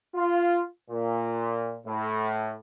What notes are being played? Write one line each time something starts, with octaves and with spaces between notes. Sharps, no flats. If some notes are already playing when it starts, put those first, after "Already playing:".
F4
A#2
A2